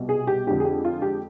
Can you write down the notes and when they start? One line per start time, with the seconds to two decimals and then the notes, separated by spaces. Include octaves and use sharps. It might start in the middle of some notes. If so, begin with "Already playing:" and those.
Already playing: C2 B2 G3
0.09 G#4
0.27 G4
0.47 F2 D3 G#3 G4
0.60 G#4
0.65 G4
0.84 F4
1.02 G4